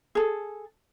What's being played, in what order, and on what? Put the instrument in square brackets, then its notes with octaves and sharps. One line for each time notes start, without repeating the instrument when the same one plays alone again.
[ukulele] G#4 A4